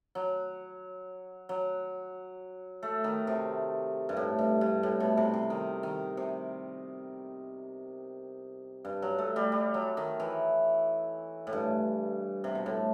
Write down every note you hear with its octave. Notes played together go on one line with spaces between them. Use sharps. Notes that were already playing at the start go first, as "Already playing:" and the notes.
F#3
F#3
A3
D#3
C3
G2
A2
G2
G2
A2
B2
C3
C3
D#3
D#3
C3
G2
F#3
A3
G3
G3
F#3
D#3
E3
A2
G2
C3
B2
A2